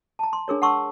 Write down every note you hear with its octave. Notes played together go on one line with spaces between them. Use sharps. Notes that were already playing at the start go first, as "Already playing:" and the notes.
A5 A#5
C6
D4 G#4 A#4 C#5
F#5 A5 C6 C#6 E6